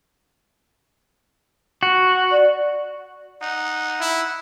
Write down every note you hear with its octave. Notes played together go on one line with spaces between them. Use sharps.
F#4
D5
D#4 F#5
E4